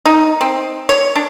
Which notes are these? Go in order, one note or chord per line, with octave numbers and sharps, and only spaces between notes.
D#4
C4
C#5
D4